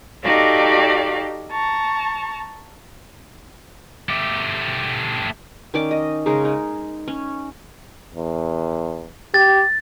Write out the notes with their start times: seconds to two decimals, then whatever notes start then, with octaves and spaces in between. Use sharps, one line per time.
0.23 D#4 F#4 G4 A4 D5 F5
1.51 A5 A#5 C#6
4.09 A3 G4
5.74 D#3 C#4 D5 D6
5.91 D#5
6.26 C#3 G#3 D#4 A#4
6.45 D#4
7.08 C#4
8.14 E2
9.34 G4 A6